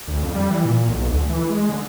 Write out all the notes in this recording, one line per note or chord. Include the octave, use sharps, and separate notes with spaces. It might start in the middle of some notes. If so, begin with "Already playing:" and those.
D2
F2
G3
E3
A#2
B1
D2
E3
G#3
D3